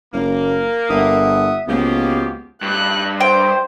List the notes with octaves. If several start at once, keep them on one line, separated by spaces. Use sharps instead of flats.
F#1 A#3
G1 E5 F#5 D#6
C#2 F3 A#3 B3 F#4 G4
G2 F#6
C5 G5